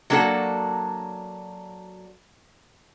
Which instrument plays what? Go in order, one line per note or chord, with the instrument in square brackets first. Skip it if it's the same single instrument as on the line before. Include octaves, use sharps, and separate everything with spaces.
[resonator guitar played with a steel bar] F#3 A#3 D4 F#4 A4